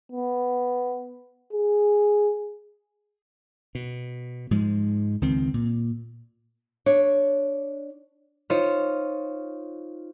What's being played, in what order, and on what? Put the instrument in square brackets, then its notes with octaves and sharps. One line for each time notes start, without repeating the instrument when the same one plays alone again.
[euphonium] B3
G#4
[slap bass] B2
G#2 F3 G#3
C#2 D#3 F3 C4
A#2
[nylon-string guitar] D4 C#5
[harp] D#4 F4 C5 C#5